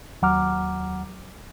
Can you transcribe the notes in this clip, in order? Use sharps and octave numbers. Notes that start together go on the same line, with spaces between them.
D#2 F#3 F#5 A#5 D6 F6